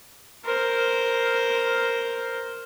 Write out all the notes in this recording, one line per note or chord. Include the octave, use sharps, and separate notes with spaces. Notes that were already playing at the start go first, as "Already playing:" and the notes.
A#4 C5